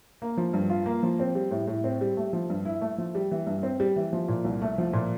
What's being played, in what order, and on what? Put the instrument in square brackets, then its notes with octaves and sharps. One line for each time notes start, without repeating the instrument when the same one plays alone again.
[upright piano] A#3
F3
G2
F4
A#3
F3
C4
G3
A2
A2
C4
G3
A3
F3
G2
E4
A3
F3
G3
E3
G2
C4
G3
E3
F3
A#2
C2
A3
F3
A#2